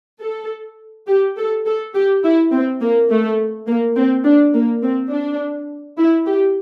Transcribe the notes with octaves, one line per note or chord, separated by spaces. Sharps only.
A4
G4
A4
A4
G4
E4
C4
A#3
A3
A#3
C4
D4
A#3
C4
D4
E4
G4